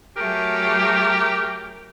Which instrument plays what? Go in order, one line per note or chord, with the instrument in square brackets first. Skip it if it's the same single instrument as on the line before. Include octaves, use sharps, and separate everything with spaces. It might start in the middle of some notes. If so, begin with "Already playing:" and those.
[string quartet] F#3 A3 G#4 [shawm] G4 [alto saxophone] A#4